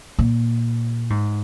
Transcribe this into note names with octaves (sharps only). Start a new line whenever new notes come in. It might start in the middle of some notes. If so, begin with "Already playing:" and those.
A#2
G#2